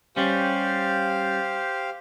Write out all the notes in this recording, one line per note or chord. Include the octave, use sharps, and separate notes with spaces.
G3 C#4 G4 C5 F5